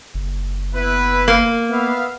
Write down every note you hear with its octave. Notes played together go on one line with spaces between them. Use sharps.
F#1
B3 E4 B4
A#3
B3 E5 F5